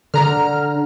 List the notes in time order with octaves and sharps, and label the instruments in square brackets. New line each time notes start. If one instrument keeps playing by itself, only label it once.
[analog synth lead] D3 [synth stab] A#5 F6